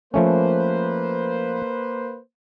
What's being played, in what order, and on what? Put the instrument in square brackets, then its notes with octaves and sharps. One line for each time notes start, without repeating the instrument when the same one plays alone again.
[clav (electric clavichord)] F3 A3 C#4 [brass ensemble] A#3 B4 C5